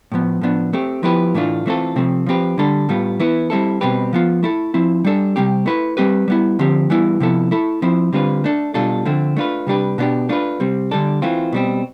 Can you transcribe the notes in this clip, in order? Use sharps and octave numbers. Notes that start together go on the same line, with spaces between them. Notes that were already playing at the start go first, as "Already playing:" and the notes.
A2 F3 B3
A2 F3 B3 D4
A3 C4 G4
F3 B3 E4 G4 B4
A2 E3 A3 D4 F4
E3 A3 C4 F4 A4
C3 F3 A3 C4
F3 C4 G4 B4
D3 G3 D4 A4
A2 G3 B3 F4
E3 B3 E4 B4
G3 C4 E4 A4
B2 G3 C4 G4 B4
F3 B3 F4
A3 E4 A4
F3 C4 E4
G3 D4 A4
C3 G3 C4 G4
A3 E4 B4
G3 C4 G4 B4
G3 B3 E4
D3 F3 C4 G4
E3 G3 B3 E4
C3 F3 B3 E4 A4
A3 E4 A4
F3 C4 E4
D3 G3 C4 F4 B4
A3 D4 A4
B2 G3 D4 F4 A4
D3 F3 A3 C4
A3 D4 F4 B4
C3 G3 D4 G4 B4
B2 B3 D4 G4
A3 D4 F4 B4
C3 G3 C4
D3 G3 D4 A4
E3 A3 C4 F4
B2 G3 C4